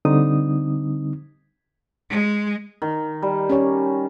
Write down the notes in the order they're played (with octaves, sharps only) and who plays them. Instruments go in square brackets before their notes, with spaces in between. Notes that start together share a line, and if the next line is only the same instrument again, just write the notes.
[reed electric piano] D3 G3 C4 D#4 D#6
[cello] G#3
[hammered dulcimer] D#3
G3
[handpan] C#4 G4 C#5